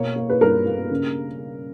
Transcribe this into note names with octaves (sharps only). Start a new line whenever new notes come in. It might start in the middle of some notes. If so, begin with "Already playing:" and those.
Already playing: B2 A#3 C#5
A#3
B4
G2 A#4
A#3
C#3